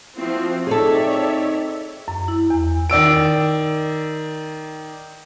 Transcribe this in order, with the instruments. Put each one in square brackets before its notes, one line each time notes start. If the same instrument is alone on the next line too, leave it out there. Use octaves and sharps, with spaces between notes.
[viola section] F3 C4 F#4 [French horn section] E4
[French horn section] C4 D#4 [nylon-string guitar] G#4 A4 [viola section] C#5 D5 E5
[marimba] F#2
E4
E2
[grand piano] D#3 D5 E6 D7